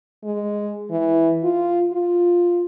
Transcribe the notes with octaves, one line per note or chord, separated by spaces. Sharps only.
G#3
E3
F4
F4